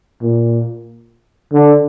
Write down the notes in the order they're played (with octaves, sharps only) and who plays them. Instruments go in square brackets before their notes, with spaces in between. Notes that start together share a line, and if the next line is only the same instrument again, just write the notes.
[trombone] A#2
D3